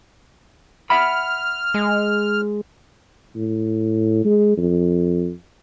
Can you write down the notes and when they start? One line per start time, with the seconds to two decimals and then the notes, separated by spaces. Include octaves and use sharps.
0.90 E5 F#5 B5 F6
1.74 G#3
3.36 A2
4.25 G#3
4.57 F2